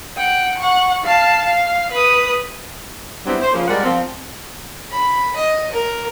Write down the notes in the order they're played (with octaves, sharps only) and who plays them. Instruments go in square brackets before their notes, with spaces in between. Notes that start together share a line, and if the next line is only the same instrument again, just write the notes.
[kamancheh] F#5 G5
F#5 C#6
F5 A5
F5
B4 D#6
[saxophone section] F#3 G3 B3 C4 D4 E4
C5
C#3 F3 A#3
G3 G#3 A#4 D5 F#5
F3 C4
[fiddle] B5
D#5
A#4